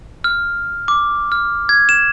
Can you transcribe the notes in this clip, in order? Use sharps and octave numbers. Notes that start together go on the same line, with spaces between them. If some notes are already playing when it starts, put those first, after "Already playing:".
F6
D6
F6
G#6
E7